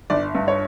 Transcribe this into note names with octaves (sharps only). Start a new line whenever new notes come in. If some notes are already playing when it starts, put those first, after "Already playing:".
G1 D5
G2
C#5